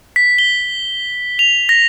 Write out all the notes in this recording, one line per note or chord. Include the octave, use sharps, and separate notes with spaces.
B6
G7
F7
A#6